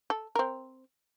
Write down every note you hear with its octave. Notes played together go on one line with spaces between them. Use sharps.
A4
C4 A#4